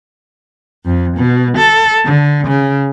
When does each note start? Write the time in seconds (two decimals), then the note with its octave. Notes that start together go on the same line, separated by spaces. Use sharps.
0.85 F2
1.17 B2
1.59 A4
2.05 D3
2.47 C#3